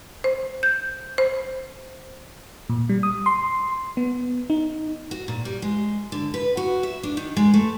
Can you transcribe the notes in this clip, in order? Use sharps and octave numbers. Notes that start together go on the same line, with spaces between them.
C5
G6
C5
A#2
G3
D#6
C6
B3
D#4
F#4
A#2
G3
G#3
D3
B4
F#4
E5
D4
D#3
G#3
A3